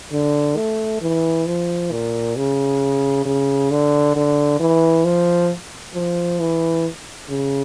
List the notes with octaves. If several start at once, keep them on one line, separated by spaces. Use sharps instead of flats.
D3
A3
E3
F3
A#2
C#3
C#3
D3
D3
E3
F3
F3
E3
C#3